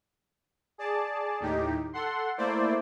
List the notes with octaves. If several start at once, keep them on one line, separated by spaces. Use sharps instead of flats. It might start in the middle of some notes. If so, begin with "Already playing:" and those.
G#4 D5 A5
D#2 A2 D#4 G4
A4 F#5 C6
A3 A#3 E4 C5 D5